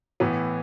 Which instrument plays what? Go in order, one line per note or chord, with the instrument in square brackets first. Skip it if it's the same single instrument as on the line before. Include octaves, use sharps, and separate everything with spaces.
[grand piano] A2 E3 B3